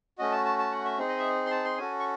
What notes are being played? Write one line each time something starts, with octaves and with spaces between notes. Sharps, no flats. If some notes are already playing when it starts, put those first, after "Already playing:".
A3 C#4 F#4 D#5
A5
A5
A5
F#5
E5
C4 D#4 G#4
D#5
E5
C6
A5
C6
C#4 F#4 A4 G#5
C#6